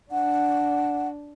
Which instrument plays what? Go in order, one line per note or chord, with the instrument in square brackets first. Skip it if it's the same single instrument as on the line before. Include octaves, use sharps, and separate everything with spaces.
[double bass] D4 [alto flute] F#5